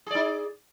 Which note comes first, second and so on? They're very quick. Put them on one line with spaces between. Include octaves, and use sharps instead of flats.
G#4 D5 D#4